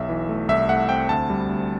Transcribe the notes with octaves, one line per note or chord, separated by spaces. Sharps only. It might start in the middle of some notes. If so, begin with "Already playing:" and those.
Already playing: B1 E5
E3
A3
C2 E5
A3 F#5
C4 G5
D2 A5
G3
D2